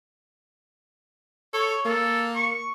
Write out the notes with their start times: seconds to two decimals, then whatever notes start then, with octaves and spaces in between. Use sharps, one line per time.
1.54 A4 C#5
1.85 A#3 A4
2.35 C#6